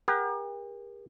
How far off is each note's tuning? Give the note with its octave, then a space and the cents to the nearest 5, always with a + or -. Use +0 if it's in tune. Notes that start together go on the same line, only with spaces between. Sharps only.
G4 +45 A#4 +30 F#5 +35